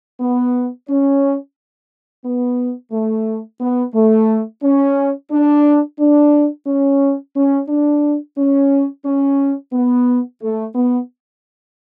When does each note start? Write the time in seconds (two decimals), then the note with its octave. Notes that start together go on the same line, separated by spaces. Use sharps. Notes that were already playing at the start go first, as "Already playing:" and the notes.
0.21 B3
0.88 C#4
2.25 B3
2.92 A3
3.61 B3
3.94 A3
4.63 C#4
5.32 D4
6.00 D4
6.67 C#4
7.36 C#4
7.69 D4
8.38 C#4
9.05 C#4
9.73 B3
10.42 A3
10.75 B3